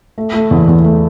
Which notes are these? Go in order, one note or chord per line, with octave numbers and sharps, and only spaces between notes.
A3
A3
E2
E2
A3